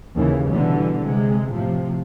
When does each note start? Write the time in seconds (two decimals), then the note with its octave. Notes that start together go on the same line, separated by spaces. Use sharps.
0.14 D#2 C#3 E3
0.49 B2 D3 E3 G3
1.04 C3 G#3
1.52 A2 C3 F3